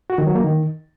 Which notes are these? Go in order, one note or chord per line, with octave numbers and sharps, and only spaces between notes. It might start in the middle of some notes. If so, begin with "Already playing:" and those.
F#4
D#3
F#3
A#3
D#3